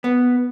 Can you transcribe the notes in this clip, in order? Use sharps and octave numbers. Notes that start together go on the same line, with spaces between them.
B3